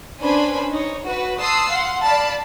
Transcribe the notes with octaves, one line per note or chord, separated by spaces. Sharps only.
C#4 D4 B4 C5 G#5 B5
D#4 C#5
F#4 B4
A5 C6 D#6 E6 F#6 C7
F5 F#5 C6
D5 F5 A5 B5